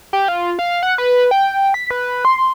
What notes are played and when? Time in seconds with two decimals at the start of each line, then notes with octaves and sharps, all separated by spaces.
0.13 G4
0.28 F4
0.59 F5
0.83 F#5
0.98 B4
1.31 G5
1.74 B6
1.91 B4
2.25 C6